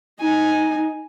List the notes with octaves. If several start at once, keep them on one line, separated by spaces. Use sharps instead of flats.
D#4 G#5